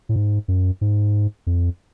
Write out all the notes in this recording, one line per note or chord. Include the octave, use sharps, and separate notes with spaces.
A2
G#2
F#2
G#2
F2